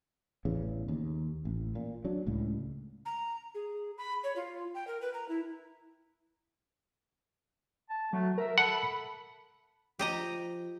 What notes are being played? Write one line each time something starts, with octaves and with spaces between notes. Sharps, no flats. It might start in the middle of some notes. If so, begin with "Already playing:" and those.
A1 E2 C#3
D#2
A1
A#2
F#3 D4
C#2 A2
A#5
G#4
B5
C#5
F4
G5
A#4
B4
A#5
E4
A5
F#3 A3
A#4 E5
A4 F#5 B5
F3 G4 D#5 A#5